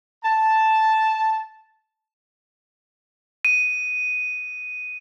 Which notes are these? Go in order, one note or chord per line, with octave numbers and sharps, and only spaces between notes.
A5
D#7